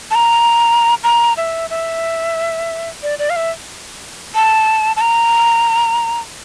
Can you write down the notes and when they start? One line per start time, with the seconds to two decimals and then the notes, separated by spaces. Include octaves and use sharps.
0.11 A5
0.15 A#5
1.04 A#5
1.37 E5
1.70 E5
3.03 D5
3.19 D5
3.30 F5
3.36 E5
4.35 A5
4.96 A5
5.01 A#5